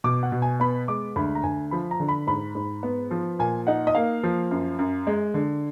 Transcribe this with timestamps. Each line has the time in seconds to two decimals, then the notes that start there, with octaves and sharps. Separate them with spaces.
0.04 B2 D6
0.23 F#5
0.32 B2
0.42 G#5
0.60 B3 B5
0.88 G#3 D6
1.16 D2 B5
1.35 A#5
1.44 D2 G#5
1.71 F3 B5
1.91 A#5
2.00 D3
2.09 B5
2.27 G#2 B5
2.55 G#2
2.83 B3
3.11 F3
3.39 A#2 G#5
3.67 D#4 F#5
3.87 D#5
3.95 A#3 F5
4.23 F3
4.51 F#2
4.79 F#2
5.07 G#3
5.34 D3